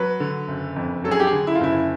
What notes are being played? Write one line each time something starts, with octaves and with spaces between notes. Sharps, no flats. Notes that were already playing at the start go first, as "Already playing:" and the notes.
Already playing: F#3 B4
D3
F#1
F2
F#3 A4
G#4
G4
G#4
D3
E4
F4
F#1 E4